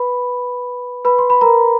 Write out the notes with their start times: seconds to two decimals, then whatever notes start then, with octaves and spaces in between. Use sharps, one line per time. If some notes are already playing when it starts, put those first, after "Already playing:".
Already playing: B4 B5
1.05 B4 B5
1.19 C6
1.30 B5
1.41 A#4 A#5